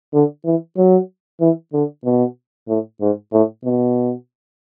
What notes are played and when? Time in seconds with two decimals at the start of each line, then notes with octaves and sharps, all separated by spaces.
0.14 D3
0.45 E3
0.77 F#3
1.41 E3
1.73 D3
2.05 B2
2.68 A2
3.01 G#2
3.33 A2
3.65 B2